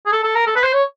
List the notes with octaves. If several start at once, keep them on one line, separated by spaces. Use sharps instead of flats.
G#4
A4
A4
A#4
A4
B4
C5
C#5